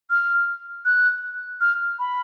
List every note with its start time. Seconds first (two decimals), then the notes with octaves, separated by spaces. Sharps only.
0.10 F6
0.85 F#6
1.61 F6
1.99 B5